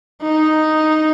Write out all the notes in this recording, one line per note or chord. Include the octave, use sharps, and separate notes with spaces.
D#4